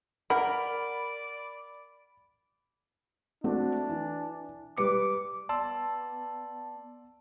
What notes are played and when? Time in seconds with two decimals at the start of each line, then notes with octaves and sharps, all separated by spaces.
0.30 A#4 D5 F#5 B5
3.44 A3 C4 D4 F#4
3.89 E3
4.78 G3 B4 D6 C#7
5.49 B3 D5 A5 C6 E6